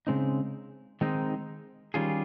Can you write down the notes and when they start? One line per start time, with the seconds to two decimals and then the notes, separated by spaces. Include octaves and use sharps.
0.07 C#3 G#3 C4 D#4
1.01 D#3 G#3 C4 D#4
1.94 D#3 G3 C#4 F4 G#4